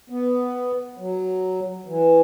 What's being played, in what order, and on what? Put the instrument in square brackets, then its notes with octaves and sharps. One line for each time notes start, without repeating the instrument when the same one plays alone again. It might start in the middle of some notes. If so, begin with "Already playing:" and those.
[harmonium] B3
F#3
E3